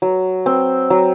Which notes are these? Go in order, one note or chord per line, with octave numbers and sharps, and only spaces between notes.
F#3
C4
F#3